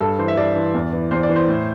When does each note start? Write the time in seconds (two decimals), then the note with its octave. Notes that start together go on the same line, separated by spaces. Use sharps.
0.01 G2 A4
0.19 E3 C5
0.28 E5
0.37 G2 D5
0.56 E3
0.74 E2
0.93 E3
1.11 E2 C5
1.23 D5
1.29 E3
1.36 C5
1.48 A2